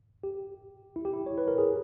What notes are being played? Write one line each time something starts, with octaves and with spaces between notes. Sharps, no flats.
G4
E4
G4
E4
C#5
B4
A#4
G#4